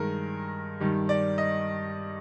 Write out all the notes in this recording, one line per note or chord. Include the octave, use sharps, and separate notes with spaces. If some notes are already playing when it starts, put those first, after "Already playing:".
Already playing: G2 D#3 G#3 A#4
G2 D#3 G3
D5
D#5